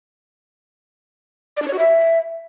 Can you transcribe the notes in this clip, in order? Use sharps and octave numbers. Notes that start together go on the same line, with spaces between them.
D5
D4
C#5
F#4
E5